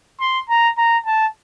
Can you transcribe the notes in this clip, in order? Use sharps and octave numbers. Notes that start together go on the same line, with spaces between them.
C6
A#5
A#5
A5